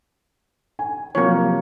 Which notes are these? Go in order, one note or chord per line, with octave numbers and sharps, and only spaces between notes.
G#5
C3 F3 F#3 A#3 C#5